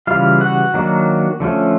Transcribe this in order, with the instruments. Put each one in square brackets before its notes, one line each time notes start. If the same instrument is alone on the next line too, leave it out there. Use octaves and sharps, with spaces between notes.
[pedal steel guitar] C#3 E3 G3 F4 F5
F#4 F#5
D#3 F#3 A#3 D4
D3 F3 A3 C#4